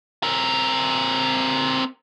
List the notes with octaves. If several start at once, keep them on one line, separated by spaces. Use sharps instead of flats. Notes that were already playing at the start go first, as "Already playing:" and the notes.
C4 A#4